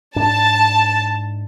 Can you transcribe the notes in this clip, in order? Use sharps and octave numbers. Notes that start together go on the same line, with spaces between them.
G#2 D4 A5